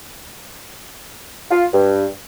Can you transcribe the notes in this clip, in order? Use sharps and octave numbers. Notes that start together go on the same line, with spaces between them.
F4
G2